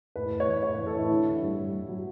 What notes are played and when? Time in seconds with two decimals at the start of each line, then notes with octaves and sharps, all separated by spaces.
0.16 A2 B4
0.31 A2
0.40 C#5
0.48 E3
0.63 A2 C#5
0.75 A2 B4
0.86 A4
0.94 A2 E4
1.10 D3
1.27 D3
1.41 G2
1.57 G2
1.73 G2
1.89 F#3